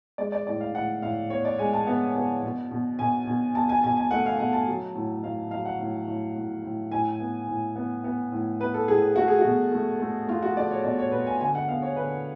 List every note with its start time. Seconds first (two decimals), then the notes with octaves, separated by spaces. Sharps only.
0.18 G#3 D5
0.32 D5
0.47 A2 D5
0.61 F5
0.74 A2 F#5
1.02 A2 F5
1.30 B3 C#5
1.45 D5
1.58 G#3 G#5
1.73 A5
1.87 B3
2.16 B3
2.43 B2
2.71 B2
2.99 B2 G#5
3.27 B2
3.55 B2 A5
3.69 G#5
3.84 B2 G#5
3.97 G#5
4.11 A3 F#5
4.26 F5
4.39 B2 F#5
4.53 A5
4.68 F#3
4.95 A2
5.24 A2 F5
5.51 F#3 F5
5.65 F#5
5.80 A2
6.07 A2
6.35 A2
6.64 A2
6.91 A2 G#5
7.20 B3
7.48 A2
7.76 B3
8.04 B3
8.32 A2
8.60 B3 B4
8.74 A4
8.88 A2 G#4
9.16 A3 F#4
9.28 G#4
9.39 F#4
9.44 B2
9.72 A3
10.00 A3
10.28 A3 F4
10.43 F#4
10.56 A3 D5
10.71 C#5
10.84 B2 D5
10.99 C#5
11.12 B2 B4
11.27 G#5
11.40 D3 G#5
11.55 F#5
11.68 B3 F5
11.82 C#5
11.96 D3 B4